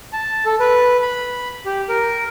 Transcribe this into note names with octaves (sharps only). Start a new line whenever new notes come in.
A5
A4
B4
B5
G4
A#4